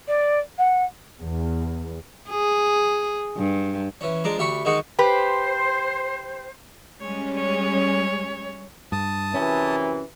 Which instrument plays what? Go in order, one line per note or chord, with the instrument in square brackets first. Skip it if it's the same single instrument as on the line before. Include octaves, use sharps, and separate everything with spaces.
[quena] D5
F#5
[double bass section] E2
[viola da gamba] G#4
G2
[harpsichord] E3 C#4
F3 G#3 D4 A#5 D6
D2 G4 E5 B5 C#6
D#3 G#3 D#4 F#4 G#4 C#6
[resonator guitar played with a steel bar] G4 B4 [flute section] C5
[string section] G3 G#3 C#4 [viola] C#5
[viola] C#5
[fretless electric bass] G2 [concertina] A5 D#6
[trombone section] F#2 C3 E3 [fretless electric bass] C#4